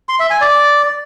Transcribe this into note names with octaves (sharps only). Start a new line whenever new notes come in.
C6
E5
G#5
D5